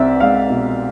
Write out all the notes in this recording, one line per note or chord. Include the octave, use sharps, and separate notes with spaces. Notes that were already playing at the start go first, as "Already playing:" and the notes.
Already playing: C2 C4 D5 E5
G#3 F5
B2